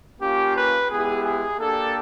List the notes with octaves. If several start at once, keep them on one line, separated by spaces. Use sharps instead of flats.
A#3 C#4 F4 G4
B4
G#3 B3 E4 G4 G#4
G#4
A#3 D4 G4 A4